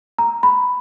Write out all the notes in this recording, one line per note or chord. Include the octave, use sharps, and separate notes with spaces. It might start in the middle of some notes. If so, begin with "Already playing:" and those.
A#5
B5